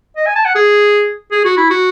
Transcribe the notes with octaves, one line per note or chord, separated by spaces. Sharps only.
D#5
G#5
A5
F#5
G#4
G#4
F#4
E4
F#4